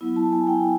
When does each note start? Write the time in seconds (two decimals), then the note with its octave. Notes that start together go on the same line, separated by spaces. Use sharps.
0.01 F#3 B3 E4
0.16 A5
0.32 G#5
0.47 G5